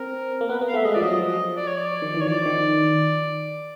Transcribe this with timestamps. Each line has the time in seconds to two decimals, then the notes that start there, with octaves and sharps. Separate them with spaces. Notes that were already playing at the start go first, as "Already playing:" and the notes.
Already playing: C4 A#4
0.41 A#3
0.49 B3 B4
0.61 B3
0.68 F5
0.74 A3 E5
0.85 G#3 D#5
0.94 F3 D5
1.03 F#3 D#5
1.21 F3
1.57 D5
1.67 C#5
1.77 D5
2.02 D#3
2.14 E3
2.21 C#5
2.27 F3 D5
2.46 D#3